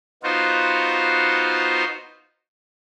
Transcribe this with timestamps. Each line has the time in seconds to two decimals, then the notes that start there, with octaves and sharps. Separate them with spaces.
0.23 B3 D#4 F4 F#4 C5